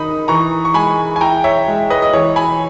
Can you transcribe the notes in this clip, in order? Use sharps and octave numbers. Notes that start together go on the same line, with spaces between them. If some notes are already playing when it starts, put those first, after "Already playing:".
Already playing: D#3 D#4 B5 D#6
E3 A#5 C#6
C#6
G#3 G#5 B5
G#5
E4 G5 A#5
C#5 E5
G#3
B4 D#5
D#5
E3 C#5
G#5 B5